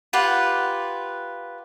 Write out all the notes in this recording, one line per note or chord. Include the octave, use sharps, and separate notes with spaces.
F4 G4 B4 F#5